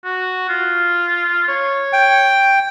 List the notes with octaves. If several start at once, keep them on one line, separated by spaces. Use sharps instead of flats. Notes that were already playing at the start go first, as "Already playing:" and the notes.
F#4
F4
C#5
G5